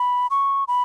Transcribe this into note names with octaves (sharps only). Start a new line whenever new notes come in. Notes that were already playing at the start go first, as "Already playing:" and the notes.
Already playing: B5
C#6
B5